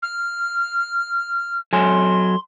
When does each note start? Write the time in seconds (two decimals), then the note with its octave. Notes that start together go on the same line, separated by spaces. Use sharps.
0.02 F6
1.73 F#3 A4 G#5 C6